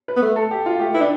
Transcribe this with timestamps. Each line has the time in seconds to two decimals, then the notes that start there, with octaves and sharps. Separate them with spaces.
0.08 B4
0.17 B3
0.22 A3
0.36 A4
0.51 G4
0.66 F4
0.79 A3 G4
0.94 E4 B4
1.01 D4